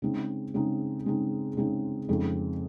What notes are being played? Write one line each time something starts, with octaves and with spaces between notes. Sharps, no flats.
C#3 G#3 C4 D#4
C#3 G#3 C4 D#4
C#3 G#3 C4 D#4
C#3 G#3 C4 D#4
F2 C#3 G#3 C4 D#4